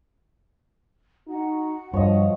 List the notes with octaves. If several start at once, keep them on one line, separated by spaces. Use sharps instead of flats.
D#4 F#4 F#5
G2 F3 C#5 D#5